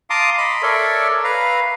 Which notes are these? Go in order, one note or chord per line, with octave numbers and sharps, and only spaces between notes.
F5 A5 A#5 C6 D6 D#6
D#5 B5 C6
A4 A#4 C#5 D5 E5
B4 F5 A#5